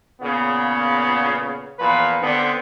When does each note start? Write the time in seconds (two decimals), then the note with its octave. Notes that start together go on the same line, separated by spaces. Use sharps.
0.21 A#2 C#3 B3
1.79 E2 A#2 F3 B4
2.22 D3 B3 C4 D4